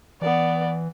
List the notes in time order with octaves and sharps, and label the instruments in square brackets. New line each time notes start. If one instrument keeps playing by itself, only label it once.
[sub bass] E3 [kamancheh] B3 D5